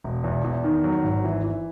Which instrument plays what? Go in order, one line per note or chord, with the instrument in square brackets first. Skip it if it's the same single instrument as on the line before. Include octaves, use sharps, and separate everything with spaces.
[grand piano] E1
E2
E2
D#3
F#3
G#1
E3
E3